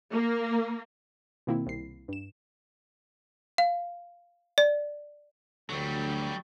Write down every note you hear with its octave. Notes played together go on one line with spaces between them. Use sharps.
A#3
B2 D#3 A#3 C4 E4
C2 C7
G2 E7
F5
D5
D2 F#3 G3